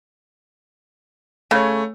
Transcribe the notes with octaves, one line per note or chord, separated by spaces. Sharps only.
C#3 A3 C#5